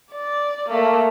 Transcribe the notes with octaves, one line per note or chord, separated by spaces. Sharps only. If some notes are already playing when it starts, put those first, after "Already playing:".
D5
A3 A#3